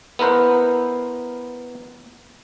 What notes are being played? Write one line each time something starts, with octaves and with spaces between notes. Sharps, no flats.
B3 E4 A#4 C5 F#5